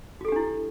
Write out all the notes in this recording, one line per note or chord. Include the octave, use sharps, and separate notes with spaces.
D4 E4 F#4 G4 A4